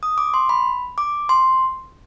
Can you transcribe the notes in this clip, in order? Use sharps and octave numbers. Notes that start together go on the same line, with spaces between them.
D#6
D6
C6
B5
D6
C6